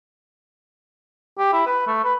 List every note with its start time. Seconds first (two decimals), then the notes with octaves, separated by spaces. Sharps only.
1.38 G4
1.53 E4
1.66 B4
1.87 A3
2.04 B4